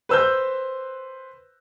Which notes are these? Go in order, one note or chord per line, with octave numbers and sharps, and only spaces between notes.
B4 C5 E6 F#6 G6